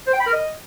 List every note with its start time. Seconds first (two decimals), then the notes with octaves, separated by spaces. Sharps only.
0.07 C5
0.14 G5
0.20 B5
0.27 A#4
0.33 D#5